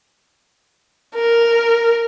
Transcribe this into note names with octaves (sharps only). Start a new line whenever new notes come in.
A#4